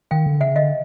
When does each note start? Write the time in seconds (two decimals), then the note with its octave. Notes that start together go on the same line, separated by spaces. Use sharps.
0.11 D#3 F5 G5
0.26 D3
0.41 C#3 E5 F#5
0.55 D3 D#5 F5